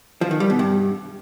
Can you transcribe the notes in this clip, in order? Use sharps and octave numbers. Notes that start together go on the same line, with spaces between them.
F3
D#3
G3
B2
G2